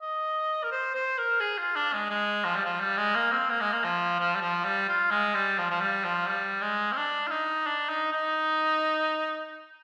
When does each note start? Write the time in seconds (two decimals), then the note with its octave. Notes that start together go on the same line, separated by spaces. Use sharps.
0.02 D#5
0.63 A#4
0.72 C5
0.94 C5
1.18 A#4
1.40 G#4
1.58 F4
1.76 D4
1.93 G#3
2.10 G#3
2.45 F3
2.56 G3
2.65 F3
2.80 G3
2.98 G#3
3.15 A#3
3.32 C4
3.50 A#3
3.61 G#3
3.72 A#3
3.84 F3
4.19 F3
4.35 G3
4.41 F3
4.64 G3
4.88 F4
5.11 G#3
5.35 G3
5.58 F3
5.70 F3
5.80 G3
6.04 F3
6.27 G3
6.61 G#3
6.92 C4
6.97 D4
7.27 F4
7.31 D#4
7.67 D4
7.89 D#4
8.13 D#4